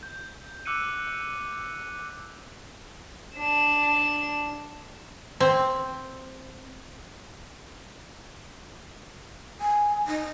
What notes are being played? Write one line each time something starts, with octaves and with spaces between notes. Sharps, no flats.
G6
D6 E6 F#6 C#7 D#7
D4 E7
C4
G#5
D#4